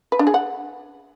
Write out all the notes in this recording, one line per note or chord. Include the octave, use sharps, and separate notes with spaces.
B4
D4
G#4
F#5